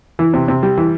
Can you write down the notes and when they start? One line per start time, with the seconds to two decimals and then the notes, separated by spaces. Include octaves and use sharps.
0.19 E3
0.34 C3
0.48 C3
0.63 G3
0.78 E3